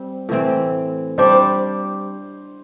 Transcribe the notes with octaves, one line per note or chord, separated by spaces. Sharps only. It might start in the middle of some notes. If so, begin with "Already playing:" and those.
Already playing: G3 C4
A2 E3 C4
G3 D4 G4 C5